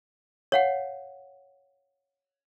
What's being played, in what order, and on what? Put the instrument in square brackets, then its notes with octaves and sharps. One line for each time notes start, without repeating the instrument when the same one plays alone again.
[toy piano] C#5 F5 F#5